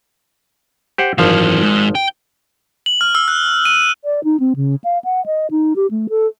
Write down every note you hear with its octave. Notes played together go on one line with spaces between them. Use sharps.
G4 C5 F#5
G#1 F#2 E3 F3 F5
G#2
G5
F#7
F6
E6
F#6
D#7
D5
D#4
C4
C#3
F5
F#5
D#5
D#4
G4
A3
A4